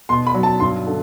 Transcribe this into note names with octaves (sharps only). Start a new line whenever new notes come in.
B2 C6
B5
F#3
A5
G2 C6
D3